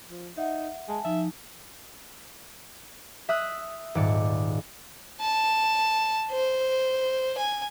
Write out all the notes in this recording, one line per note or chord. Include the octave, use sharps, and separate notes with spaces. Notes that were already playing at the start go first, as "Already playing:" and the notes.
F3
D#4 E5 F#5
G#3 G#5 A5
F3 D#4 E5
E5 D#6 F#6
D#1 G#2 D5 C#7
A5
C5
G#5